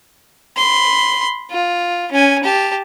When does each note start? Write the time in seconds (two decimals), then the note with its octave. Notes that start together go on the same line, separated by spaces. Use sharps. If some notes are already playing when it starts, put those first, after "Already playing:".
0.57 B5 C6
1.51 F4
2.12 C#4 G#5
2.43 G4 A5